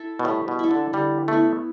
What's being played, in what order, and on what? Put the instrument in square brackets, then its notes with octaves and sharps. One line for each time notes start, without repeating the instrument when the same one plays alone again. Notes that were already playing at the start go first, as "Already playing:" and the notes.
Already playing: [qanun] E4 A4
[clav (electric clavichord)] B2
[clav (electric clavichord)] A2 [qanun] G3
[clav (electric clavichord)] B2
[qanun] E4 A4
[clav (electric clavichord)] D3
[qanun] D3 [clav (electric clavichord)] G3
[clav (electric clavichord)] A3 [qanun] B3 E4